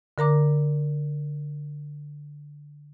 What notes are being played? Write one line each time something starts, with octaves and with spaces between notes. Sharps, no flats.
D3 A#4 A#5 D6